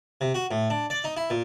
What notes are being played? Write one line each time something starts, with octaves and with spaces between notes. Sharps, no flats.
C3
F#4
A2
D4
D5
D#4
E4
A#2